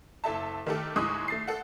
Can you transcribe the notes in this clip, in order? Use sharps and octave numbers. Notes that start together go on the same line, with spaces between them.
F#1 A4 E5 A5
D#3 A3 G4 A4
D#2 A2 G#3 C#6 D#6 F#6
A3 A6 C7
A4 F#5